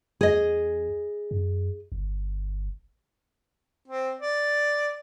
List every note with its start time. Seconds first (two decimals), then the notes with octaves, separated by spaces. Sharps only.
0.21 E2 G#4 D#5
1.31 F#2
1.92 G1
3.88 C4
4.20 D5